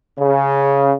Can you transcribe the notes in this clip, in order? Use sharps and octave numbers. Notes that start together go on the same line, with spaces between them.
C#3